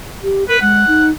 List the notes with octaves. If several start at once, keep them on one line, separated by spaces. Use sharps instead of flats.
G4
A#4 B4
G#3 F#5
D#4